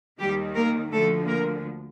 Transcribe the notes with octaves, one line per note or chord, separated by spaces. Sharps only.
D#2 D#3 G3 G4
A#3 A#4
D2 D3 F3 A3 A4
A#3 A#4